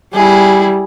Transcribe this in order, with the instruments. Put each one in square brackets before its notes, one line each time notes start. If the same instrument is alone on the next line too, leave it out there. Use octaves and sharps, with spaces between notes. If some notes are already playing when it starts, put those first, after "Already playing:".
[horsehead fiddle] G3 [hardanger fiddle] E4 G#4